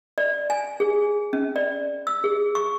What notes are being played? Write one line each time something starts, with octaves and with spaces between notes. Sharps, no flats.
D5
G#5
G#4
C#4
D5
E6
G#4
C#6